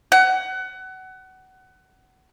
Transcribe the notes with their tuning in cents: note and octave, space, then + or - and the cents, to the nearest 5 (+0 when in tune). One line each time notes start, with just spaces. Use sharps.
F#5 +25